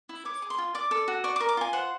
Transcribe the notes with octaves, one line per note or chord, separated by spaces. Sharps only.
E4
C#5 D6
G#4
C6
F4
D5 D6
A4
F#4
D5 C#6
D6
A#4
D6
F4 G#5
C5 F#5